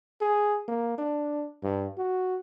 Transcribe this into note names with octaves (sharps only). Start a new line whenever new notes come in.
G#4
A#3
D4
G2
F#4